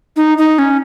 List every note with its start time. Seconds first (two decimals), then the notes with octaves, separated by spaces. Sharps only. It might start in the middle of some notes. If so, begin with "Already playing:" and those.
0.16 D#4
0.38 D#4
0.59 C#4